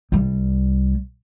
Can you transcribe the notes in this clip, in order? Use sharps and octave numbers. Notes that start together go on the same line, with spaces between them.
C2 G3